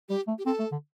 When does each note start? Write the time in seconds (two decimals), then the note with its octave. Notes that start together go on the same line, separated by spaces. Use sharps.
0.09 G3 G4
0.28 A3
0.39 G4
0.46 C4 A4
0.59 A3
0.72 D3